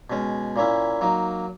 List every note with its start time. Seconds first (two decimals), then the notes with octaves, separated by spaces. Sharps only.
0.10 B2 G#3 C#4
0.56 A#2 A#3 C#4 E4
1.01 F#3 A#3 D#4